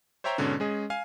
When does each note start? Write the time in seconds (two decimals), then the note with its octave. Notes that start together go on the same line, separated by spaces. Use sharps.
0.24 C5 C#5 E5 G5 A#5 C6
0.38 G#2 B2 D3 C#4
0.60 G#3 C#4 G#4 D#5
0.90 F5 G#5